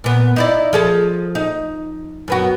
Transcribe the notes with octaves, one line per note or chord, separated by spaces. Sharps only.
A#2 B3
D#4 E4 D5
F3 G#4 A4
D#4
F#2 B3 F#4